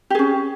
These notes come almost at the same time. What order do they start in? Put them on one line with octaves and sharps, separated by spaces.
G4 G#4 C#4